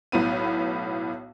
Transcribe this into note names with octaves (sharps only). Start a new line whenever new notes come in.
B1 A2 B3 D#7